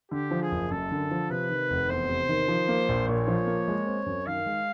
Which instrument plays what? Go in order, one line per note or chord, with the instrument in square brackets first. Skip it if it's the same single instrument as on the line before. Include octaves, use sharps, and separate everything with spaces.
[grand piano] D3 [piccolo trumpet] G4
[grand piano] F3
[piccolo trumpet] G#4
[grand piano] F#1
[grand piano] F#2 [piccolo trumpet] A4
[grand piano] D3
F3
[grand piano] C3 [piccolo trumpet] B4
[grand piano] D#3
F1
[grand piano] E2 [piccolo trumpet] C5
[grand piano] C3
D#3
F3
A#3
A#1
[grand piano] A#2 [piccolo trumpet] C#5
[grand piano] F3
A#3
G#3
C4
F#2
[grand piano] D#3 [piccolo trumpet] F5
[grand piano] G#3